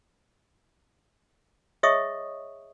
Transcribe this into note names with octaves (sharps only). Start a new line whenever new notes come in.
G#4 C#5 D#5 E5 C#6 D#6